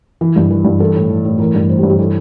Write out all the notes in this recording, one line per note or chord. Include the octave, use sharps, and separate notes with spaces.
E3
G2
E3
G2
E3 A4
A2
E3
A2
E3 A#4
G2
E3 C5
G4
G2
G4
E3 A4